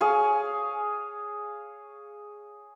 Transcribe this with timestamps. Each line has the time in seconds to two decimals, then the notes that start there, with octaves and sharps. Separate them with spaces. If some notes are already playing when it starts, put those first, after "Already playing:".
0.01 G#4 C#5 F5